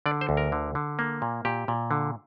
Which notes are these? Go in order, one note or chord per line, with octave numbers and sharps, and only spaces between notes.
D3 D5
C5
D2
A#4
D3
D3
A#3
A#2
A#2 G4
A#2
D3